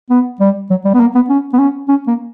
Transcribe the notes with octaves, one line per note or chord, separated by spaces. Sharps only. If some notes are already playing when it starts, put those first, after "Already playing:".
B3
G3
F#3
G3
B3
A#3
B3
C#4
B3
C#4
C#4
A#3